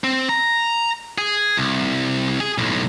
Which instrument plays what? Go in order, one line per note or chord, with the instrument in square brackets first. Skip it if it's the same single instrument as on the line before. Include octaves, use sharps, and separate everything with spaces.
[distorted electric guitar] C4
A#5
G#4
C2
G#4
B1 A2